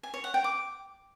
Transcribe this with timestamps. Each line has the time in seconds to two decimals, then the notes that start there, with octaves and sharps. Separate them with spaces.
0.03 G#5
0.14 C#5
0.24 F#5
0.34 G5
0.44 D6